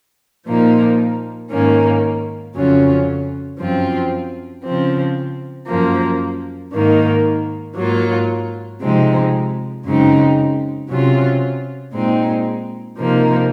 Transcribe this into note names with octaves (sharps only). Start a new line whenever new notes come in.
A#2 F3 A#3 D#4
G#2 D#3 A#3 C#4
F2 C#3 F#3 C#4 F4
F#2 F3 C4 F4
C#3 F3 C4
F#2 F3 A#3
G#2 D#3 A#3 D#4
G#2 F#3 A#3 F4
C3 F3 G#3 C4 D#4
F#2 C#3 G#3 C4 D#4
C3 F#3 C#4 F4
A#2 G#3 C4 D#4
C3 F3 A#3 D#4